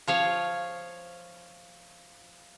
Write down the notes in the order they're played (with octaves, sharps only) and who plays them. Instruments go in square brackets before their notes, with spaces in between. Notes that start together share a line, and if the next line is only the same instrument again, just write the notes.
[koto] F3 C#5 F5